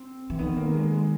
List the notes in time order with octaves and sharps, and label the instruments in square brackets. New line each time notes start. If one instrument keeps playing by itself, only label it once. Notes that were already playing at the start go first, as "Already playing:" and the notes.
Already playing: [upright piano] C4
[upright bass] E3
[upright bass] D#3 [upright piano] B3
[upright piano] A#3
G#3
G#3